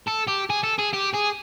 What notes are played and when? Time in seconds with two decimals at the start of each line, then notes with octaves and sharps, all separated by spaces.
0.07 A4
0.27 G4
0.50 G#4
0.64 A4
0.79 G#4
0.94 G4
1.14 G#4